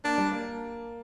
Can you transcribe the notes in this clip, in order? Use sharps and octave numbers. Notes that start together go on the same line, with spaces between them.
A#3 D4
G3
A#3